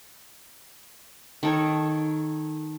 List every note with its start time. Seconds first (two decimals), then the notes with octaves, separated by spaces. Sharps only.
1.43 D#3 A4 C#5